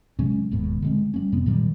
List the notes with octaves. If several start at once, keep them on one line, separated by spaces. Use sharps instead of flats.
C3 F#3 G#3 C#4
E1 D#2 G#2 B2
D3 G#3 C4
G3 A#3 C#4
F2 C3 B3 C4
A#2 D#3 F#3 G3